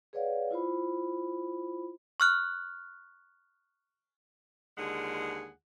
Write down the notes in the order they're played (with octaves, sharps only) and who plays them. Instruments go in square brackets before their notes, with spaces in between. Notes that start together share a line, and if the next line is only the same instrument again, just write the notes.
[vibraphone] G#4 B4 C#5 D5 F5 F#5
E4 F4 C5 B5
[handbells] C#6 F6 F#6
[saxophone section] D#2 D3 G#3 F4 G#4 F#5